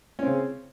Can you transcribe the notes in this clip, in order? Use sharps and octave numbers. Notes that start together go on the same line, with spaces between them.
C#3 C4 C#4